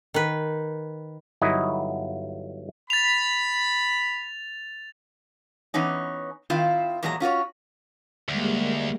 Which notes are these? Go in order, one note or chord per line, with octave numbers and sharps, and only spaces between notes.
D#3 B4
G1 F#3 D#4 E4 D#5
B5 A6 F7
E3 B3 C#4 D#4
D#3 C4 E4 F4 F5
E2 A#2 F#3 G#3 D#4 A#5
C#4 F4 F#4 C#5
D2 G3 G#3 A#3